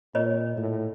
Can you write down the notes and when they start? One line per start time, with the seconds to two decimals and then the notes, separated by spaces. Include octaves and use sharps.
0.15 A#2 C#5 D#5
0.57 A2